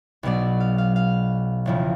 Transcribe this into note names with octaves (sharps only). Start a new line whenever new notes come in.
B1 B2 F#3 D5
F5
F5
F5
E1 E2 C#3 F3